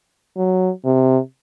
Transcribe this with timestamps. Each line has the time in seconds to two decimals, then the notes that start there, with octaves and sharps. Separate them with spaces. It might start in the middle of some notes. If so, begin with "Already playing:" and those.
0.37 F#3
0.85 C3